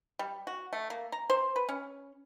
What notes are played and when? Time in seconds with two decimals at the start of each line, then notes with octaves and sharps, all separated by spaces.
0.19 G3
0.47 F#4
0.73 A3
0.90 A#3
1.12 A#5
1.30 C5
1.56 B4
1.69 C#4